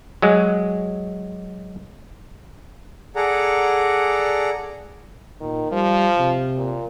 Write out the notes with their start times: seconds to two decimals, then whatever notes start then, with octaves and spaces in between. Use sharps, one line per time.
0.22 F#3 G#3
3.16 G#4 A4 D5 F#5 A#5
5.41 A#2 D#3
5.71 F3 G3
6.18 C3
6.57 A#2